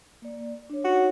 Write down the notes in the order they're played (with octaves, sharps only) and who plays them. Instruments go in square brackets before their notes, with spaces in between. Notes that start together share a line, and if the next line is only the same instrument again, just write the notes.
[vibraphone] A#3 D5
D4 C#5
[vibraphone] D#4 C#5 [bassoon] F#4